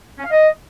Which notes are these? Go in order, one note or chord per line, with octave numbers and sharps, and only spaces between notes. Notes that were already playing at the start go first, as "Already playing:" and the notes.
C#4
F5
D#5